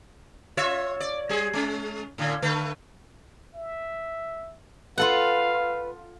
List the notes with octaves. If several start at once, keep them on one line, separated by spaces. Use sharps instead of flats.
F4 C#5 E5
D5
G3 G#4
G#3 C#4
A2 D3
D3 A3 B4
E5
F4 A4 B4 F5 F#5